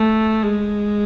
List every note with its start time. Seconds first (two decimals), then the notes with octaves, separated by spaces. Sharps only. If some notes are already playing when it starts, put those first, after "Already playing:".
Already playing: A3
0.43 G#3